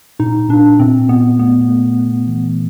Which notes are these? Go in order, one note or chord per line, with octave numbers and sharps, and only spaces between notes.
A#2 D#4
A#2 D4
A#2 C4
A#2 B3
A3 B3
A3
A3
E3